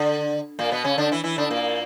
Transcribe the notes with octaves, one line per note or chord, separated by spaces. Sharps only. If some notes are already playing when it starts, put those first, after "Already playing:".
Already playing: D3
A#2 A#3
B2 B3
C#3 C#4
D3 D4
E3 E4
E3 E4
D3 D4
A#2 A#3